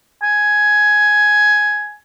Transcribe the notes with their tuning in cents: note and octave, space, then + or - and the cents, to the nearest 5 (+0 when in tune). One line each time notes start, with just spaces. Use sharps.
G#5 +10